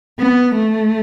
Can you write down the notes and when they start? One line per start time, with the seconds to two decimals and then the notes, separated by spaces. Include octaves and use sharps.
0.19 B3
0.55 A3